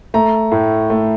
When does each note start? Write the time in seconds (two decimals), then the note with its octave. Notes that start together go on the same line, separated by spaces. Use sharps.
0.14 A3 A#5
0.52 A2
0.90 A3